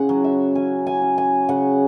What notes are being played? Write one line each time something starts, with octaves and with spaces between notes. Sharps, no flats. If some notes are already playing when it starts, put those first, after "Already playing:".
Already playing: C#3 F#5
F#3
E5
C#4 G#5
G#5
C#4
G#5
C#3 F#5